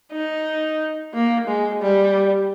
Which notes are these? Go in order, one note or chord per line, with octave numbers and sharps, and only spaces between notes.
D#4
A#3
G#3
G3